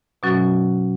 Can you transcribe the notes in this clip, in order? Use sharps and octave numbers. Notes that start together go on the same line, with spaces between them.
B2 F#3 C#4 F#4